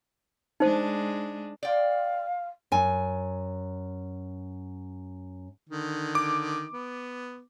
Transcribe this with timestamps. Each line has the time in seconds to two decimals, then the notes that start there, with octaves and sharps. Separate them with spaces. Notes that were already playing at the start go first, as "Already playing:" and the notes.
0.60 G#3 D4 D#4 C5
1.63 D5 F5 G5
2.72 F#2 G#5
5.69 D3 D#3
6.15 D6
6.73 B3